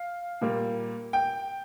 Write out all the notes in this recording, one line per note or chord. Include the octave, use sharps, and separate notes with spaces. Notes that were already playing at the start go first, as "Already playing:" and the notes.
Already playing: F5
A#2 G3 A#3
G5